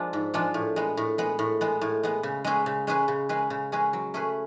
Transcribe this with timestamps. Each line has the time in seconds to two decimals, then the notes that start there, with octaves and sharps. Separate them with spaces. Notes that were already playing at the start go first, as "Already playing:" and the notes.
Already playing: F3 G#3 D4 F4
0.13 G#2
0.34 F3 G#3 D4 F4
0.54 A2
0.76 G#3 B3
0.97 A2
1.18 G#3 B3
1.39 A2
1.61 G#3 B3
1.81 A2
2.03 G#3 B3
2.23 C#3
2.44 G#3 C#4 G#4 B4
2.66 C#3
2.87 G#3 C#4 G#4 B4
3.08 C#3
3.29 G#3 C#4 G#4 B4
3.50 C#3
3.72 G#3 C#4 G#4 B4
3.93 F#3
4.14 A3 C#4 G#4 B4